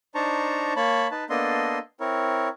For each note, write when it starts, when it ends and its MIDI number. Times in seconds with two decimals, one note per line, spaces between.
0.15 0.73 62
0.15 0.73 63
0.15 0.73 72
0.15 0.73 81
0.15 0.73 82
0.15 0.73 85
0.76 1.07 58
0.76 1.07 73
0.76 1.07 81
0.76 1.07 83
1.11 1.24 63
1.11 1.24 71
1.11 1.24 81
1.30 1.79 58
1.30 1.79 59
1.30 1.79 62
1.30 1.79 69
1.30 1.79 75
1.30 1.79 84
2.00 2.48 60
2.00 2.48 64
2.00 2.48 70
2.00 2.48 73